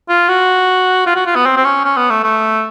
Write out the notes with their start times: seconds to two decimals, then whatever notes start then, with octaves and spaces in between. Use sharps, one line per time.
0.09 F4
0.29 F#4
1.07 F4
1.16 F#4
1.26 F4
1.35 B3
1.46 C4
1.57 C4
1.65 C#4
1.84 C#4
1.97 B3
2.10 A3
2.23 A3